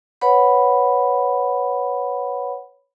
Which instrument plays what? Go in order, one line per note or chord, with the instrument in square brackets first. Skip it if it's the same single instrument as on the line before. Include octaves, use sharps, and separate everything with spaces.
[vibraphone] B4 C#5 F#5 B5